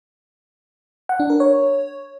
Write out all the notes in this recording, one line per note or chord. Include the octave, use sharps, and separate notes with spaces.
F#5
D4
A#4
C#5